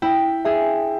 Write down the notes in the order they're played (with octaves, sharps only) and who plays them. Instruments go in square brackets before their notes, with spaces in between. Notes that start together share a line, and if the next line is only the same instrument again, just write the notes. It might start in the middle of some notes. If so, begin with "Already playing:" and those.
[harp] E4 [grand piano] G5
[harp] G#4 [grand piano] E5